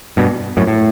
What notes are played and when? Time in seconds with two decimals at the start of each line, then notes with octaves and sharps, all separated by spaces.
0.17 G2 B2
0.57 F#2 A2
0.67 A2